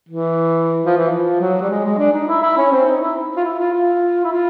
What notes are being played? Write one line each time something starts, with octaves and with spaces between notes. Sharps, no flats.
E3
F3
E3
F3
F#3
G3
G#3
G#3
D4
D#4
E4
E4
C#4
C4
D#4
E4
F4
E4
F4
F4
E4
F4